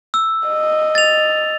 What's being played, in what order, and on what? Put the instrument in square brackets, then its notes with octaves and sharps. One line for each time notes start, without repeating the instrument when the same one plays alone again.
[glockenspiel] E6
[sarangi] D#5
[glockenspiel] A6 F7